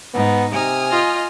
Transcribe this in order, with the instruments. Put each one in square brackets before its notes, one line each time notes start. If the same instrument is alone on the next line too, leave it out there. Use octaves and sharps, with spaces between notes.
[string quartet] G#2 [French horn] B3 [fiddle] D#4
[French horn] C3 [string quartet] G#5 D#6 F6
[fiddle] F4 D#5